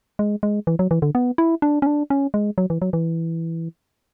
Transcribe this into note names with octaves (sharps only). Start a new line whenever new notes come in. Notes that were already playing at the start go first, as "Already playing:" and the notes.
G#3
G#3
E3
F#3
E3
D3
B3
E4
D4
C#4
D4
C#4
G#3
F#3
E3
F#3
E3